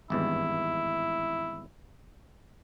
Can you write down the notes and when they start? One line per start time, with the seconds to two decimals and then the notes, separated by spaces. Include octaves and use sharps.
0.10 G#1 E2 G2 E4